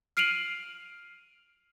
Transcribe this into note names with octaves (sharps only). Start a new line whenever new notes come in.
F6 C7 D7 D#7 F7 F#7